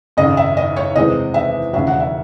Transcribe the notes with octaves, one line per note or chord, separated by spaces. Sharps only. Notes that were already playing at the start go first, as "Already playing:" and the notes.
G#1 F#2 C#3 D#5
E5
D#5
C#5
E2 C3 D#3 G#3 C4 D#5
E5
E1 D#2 C#3 F#3 E5
F#5
E5